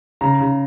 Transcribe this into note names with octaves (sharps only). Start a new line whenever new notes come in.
C#3 A#5
C#3